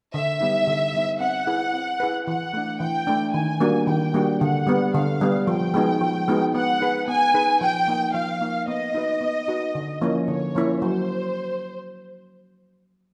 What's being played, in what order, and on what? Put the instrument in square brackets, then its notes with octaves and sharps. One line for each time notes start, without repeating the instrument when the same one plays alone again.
[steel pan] D3 [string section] E5
[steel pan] G3 B3 D#4
D3
G3 B3 D#4
[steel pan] C4 [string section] F#5
[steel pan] E4 G#4 B4
C4
E4 G#4 B4
[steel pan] E3 [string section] F#5
[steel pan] A3 D4
[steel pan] E3 [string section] G5
[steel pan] A3 D4
[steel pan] D#3 [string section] G#5
[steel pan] G3 A#3 D4 F#4
[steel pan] D#3 [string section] G5
[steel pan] G3 A#3 D4 F#4
[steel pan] D3 [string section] F#5
[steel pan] G3 B3
[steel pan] D3 [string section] F5
[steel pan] G3 B3
[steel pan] F3 [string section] G5
[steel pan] G#3 B3 D#4 F#4
F3
G#3 B3 D#4 F#4
[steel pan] B3 [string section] F#5
[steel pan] D#4 G#4 B4
[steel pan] B3 [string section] G#5
[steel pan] D#4 G#4 B4
[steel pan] F3 [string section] G5
[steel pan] A#3 D#4
[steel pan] F3 [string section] F5
[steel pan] A#3 D#4
[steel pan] B3 [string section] D#5
[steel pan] D#4 F#4 B4
B3
D#4 F#4 B4
D3
F3 A#3 C#4 E4
[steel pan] D3 [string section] C#5
[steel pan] F3 A#3 C#4 E4
[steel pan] F#3 [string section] C5